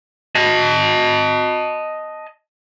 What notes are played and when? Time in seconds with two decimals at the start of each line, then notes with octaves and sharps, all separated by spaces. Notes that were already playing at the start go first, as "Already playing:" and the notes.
0.35 D#5 A5